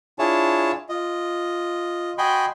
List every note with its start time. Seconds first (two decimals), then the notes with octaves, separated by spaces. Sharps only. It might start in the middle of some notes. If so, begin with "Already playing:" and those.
0.19 D4 E4 F4 G#4 C#5 A5
0.89 F4 D#5
2.18 F#4 D#5 G5 G#5 B5 C6